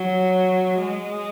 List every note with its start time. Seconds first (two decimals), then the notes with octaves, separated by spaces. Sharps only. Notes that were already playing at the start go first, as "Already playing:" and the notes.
Already playing: F#3
0.79 G#3